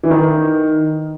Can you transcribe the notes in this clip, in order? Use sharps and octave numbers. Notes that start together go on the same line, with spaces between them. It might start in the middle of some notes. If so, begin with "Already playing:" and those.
E3
D#3